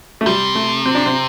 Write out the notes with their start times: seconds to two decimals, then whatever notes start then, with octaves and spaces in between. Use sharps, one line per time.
0.21 A3
0.26 C3 G3
0.55 A3
0.86 C4
0.95 D4
1.06 C4